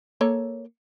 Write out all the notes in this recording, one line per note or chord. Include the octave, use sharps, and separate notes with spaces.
A#3 A4 C#5